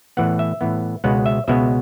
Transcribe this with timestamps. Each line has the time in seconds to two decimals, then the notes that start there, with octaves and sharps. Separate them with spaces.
0.17 A2 E3 B3 F#5
0.39 E5
0.61 A2 E3 B3
1.04 C#2 B2 G#3 B3 F#5
1.26 E5
1.48 C#2 B2 G#3 B3 E5